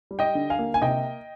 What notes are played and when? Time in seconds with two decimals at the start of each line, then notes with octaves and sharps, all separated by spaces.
0.11 G3
0.19 D#5 G5
0.35 D3
0.50 F5 G#5
0.59 A#3
0.74 G#5
0.82 C3 D#5 G5